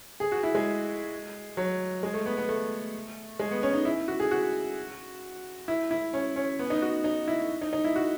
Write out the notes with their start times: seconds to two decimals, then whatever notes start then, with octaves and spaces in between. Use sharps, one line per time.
0.20 G#4
0.32 F#4
0.43 E4
0.55 G#3
1.57 F#3
2.03 G#3
2.14 A3
2.26 B3
2.37 B3
2.49 A3
3.39 G#3
3.51 B3
3.63 C#4
3.74 D#4
3.85 E4
4.08 F#4
4.20 G#4
4.31 F#4
5.68 E4
5.91 E4
6.13 C#4
6.36 C#4
6.59 B3
6.70 D#4
6.82 F#4
7.04 D#4
7.28 E4
7.61 D#4
7.73 D#4
7.84 E4
7.96 F#4